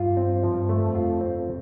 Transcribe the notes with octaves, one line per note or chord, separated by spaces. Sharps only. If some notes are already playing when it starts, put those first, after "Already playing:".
Already playing: G2 F4
C4
G2 F3
A3
F2
F4
C4